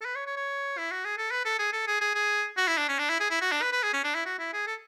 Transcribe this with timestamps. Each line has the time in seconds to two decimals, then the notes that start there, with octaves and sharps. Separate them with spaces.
0.01 A4
0.05 B4
0.15 C#5
0.27 C#5
0.37 C#5
0.78 E4
0.92 F#4
1.05 G#4
1.18 A4
1.31 B4
1.45 A4
1.59 G#4
1.73 A4
1.87 G#4
2.01 G#4
2.15 G#4
2.57 F#4
2.68 E4
2.78 D4
2.89 C#4
2.99 D4
3.09 E4
3.20 G#4
3.31 E4
3.41 F#4
3.52 D4
3.62 B4
3.72 B4
3.83 G#4
3.93 C#4
4.04 D4
4.15 E4
4.25 F#4
4.39 E4
4.53 G#4
4.67 A4